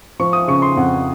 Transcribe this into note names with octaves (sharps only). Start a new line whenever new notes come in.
F3 C#6
D#6
C#3 C#6
C6
F2 F#5